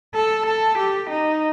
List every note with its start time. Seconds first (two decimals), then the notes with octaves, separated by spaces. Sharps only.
0.15 A4
0.47 A4
0.78 G4
1.10 D#4